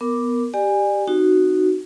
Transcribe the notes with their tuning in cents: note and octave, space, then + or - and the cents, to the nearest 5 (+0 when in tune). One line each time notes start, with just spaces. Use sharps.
B3 +0 A#4 +0 D6 +0
G4 +0 D5 +30 G#5 -20
C4 +0 D#4 -20 F#4 +0